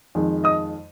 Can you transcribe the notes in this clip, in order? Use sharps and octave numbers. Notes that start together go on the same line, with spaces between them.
F2 D#3 G#3
D#5 D#6